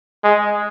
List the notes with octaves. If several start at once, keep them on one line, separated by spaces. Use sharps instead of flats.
G#3